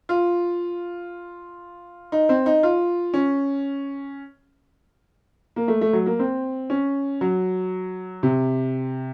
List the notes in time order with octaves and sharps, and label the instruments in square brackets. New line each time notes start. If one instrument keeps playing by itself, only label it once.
[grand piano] F4
D#4
C4
D#4
F4
C#4
A#3
A3
A3
F#3
A#3
C4
C#4
F#3
C3